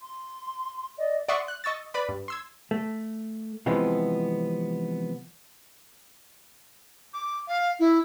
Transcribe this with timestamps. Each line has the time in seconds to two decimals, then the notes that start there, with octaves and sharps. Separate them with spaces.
0.01 C6
0.98 D5 D#5
1.29 D5 E5 F#5 C6 C#6 D#6
1.48 F#6
1.64 D#5 C#6 E6 A6
1.94 B4 D5 B5
2.09 G2
2.28 C6 E6 G#6
2.71 A3
3.66 C3 E3 F3 G#3 B3
7.13 D6
7.47 F5
7.79 E4